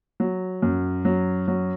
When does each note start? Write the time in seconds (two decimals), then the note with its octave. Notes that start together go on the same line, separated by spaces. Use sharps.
0.20 F#3
0.62 F#2
1.05 F#3
1.48 F#3